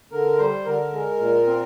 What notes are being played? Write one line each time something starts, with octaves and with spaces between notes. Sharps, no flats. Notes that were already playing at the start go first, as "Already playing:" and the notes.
D3 A#4
G3 C5
D3 A#4
G#3
A#2
C4